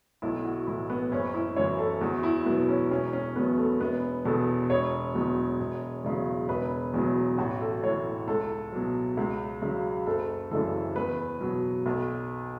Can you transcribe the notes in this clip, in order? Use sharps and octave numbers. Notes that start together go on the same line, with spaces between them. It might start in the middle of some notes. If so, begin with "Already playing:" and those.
B1 E4
F#4
A2 E3 E4
B3
F#1 C#4
E4
F#2 E3 C#5
A4
E2 F#4
E4
B2 F#3 B3
C#4
E1 C#4
C#4
E2 B2 F#3 B3
A3
E1 B3
E2 B2 A4
E1 C#5
E2 B2 F#3
E1
E2 C#3 F#3
E1 B4
E2 B2 F#3
A1 F#4
A4
A2 E3 C#5
C#2 A4
B2 F#3
C#2
C#3 F#3
F#1 A4
F#2 C#3 E3 A4
E2 B4
B2 F#3
B1